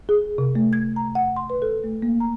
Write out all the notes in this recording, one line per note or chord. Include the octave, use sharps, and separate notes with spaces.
G#4
C3
A3
G#6
A#5
F#5
C6
B4
A4
A3
A#3
A#5